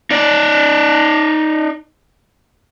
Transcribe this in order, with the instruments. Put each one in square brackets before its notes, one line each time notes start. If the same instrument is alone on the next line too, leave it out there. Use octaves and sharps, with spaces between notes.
[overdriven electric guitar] D#4 D5